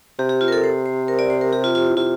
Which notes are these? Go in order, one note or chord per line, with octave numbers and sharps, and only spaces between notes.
C3 G4
G4
F4
A#4
A4
C5
C5
A#4
D5
C5
A#4
G4
F4
F4
E4
C3 F4